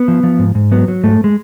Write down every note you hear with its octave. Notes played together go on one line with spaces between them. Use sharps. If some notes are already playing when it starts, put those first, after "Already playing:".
Already playing: B3
F3
F3
G#2
G#2
F#3 B3
F#3
G#2 A3
G#3